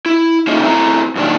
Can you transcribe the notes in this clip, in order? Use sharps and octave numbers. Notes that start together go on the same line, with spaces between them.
E4
A3 A#3 C#4 D#4 F4 G#4
A3 C4 E4 A#5
F#2 A#2 D#3 D4